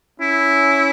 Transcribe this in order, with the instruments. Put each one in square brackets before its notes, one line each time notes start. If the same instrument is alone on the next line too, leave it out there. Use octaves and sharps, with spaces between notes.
[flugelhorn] C#4 [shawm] E4